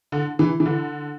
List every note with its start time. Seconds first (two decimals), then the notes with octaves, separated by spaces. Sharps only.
0.12 D3
0.39 E3
0.60 E3
0.66 D3